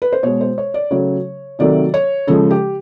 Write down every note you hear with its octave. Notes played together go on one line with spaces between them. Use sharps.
B4
C5
B2 G#3 C#5
C5
C#5
D5
C#3 F#3 A3 C#5
C3 D#3 F#3 A3 D5
C#5
C#3 F3 G#3 A4
G4